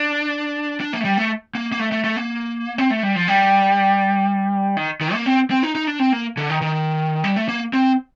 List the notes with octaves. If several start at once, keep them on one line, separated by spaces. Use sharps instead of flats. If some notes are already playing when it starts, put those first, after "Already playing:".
Already playing: D4
D4
A#3
A3
G3
A3
A#3
A#3
A3
A3
A3
A#3
C4
A3
G3
F3
G3
D#3
D#3
A#3
C4
C4
D#4
D#4
D4
C4
A#3
D3
D#3
D#3
G3
A3
A#3
C4